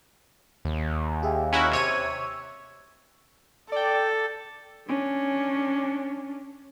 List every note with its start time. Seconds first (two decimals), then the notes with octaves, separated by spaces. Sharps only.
0.65 D#2
1.23 G4 G#4 E5
1.52 C#4 E4 F#4 G#5 A#5 F#6
1.72 C3 C#5 E6 D#7
3.72 A4 D5 G5
4.88 C#4 D4